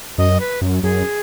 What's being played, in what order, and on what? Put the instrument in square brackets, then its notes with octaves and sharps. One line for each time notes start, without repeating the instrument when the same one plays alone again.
[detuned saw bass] F#2 [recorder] D#5
[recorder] B4
[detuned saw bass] F#2
[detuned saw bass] F#2 [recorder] G#4